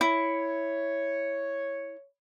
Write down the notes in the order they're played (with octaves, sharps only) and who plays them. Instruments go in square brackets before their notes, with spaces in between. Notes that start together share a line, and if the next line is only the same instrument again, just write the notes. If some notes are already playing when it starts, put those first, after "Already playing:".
[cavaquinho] E4 [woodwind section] C#5